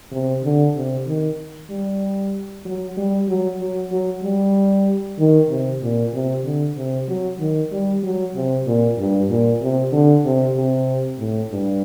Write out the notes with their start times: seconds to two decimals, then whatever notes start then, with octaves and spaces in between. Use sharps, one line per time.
0.12 C3
0.44 D3
0.75 C3
1.07 D#3
1.70 G3
2.65 F#3
2.97 G3
3.28 F#3
3.60 F#3
3.92 F#3
4.23 G3
5.19 D#3
5.50 C3
5.82 A#2
6.13 C3
6.45 D3
6.76 C3
7.08 F#3
7.40 D#3
7.72 G3
8.03 F#3
8.35 C3
8.67 A#2
8.98 G2
9.30 A#2
9.62 C3
9.92 D3
10.25 C3
10.56 C3
11.19 A2
11.51 G2